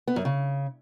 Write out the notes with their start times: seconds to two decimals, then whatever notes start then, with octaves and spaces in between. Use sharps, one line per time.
0.07 B3
0.16 F#2
0.25 C#3